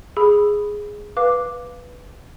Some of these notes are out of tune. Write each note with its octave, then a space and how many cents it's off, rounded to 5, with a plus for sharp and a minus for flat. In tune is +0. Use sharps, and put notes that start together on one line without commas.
G#4 +0 B5 +0 E6 +0
B4 -5 F5 +0 D6 +0